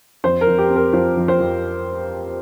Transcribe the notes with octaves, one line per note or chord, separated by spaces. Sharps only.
F2 C5
A#4
F2
G4
C4
A#4
F3 C5
F2
C5
F2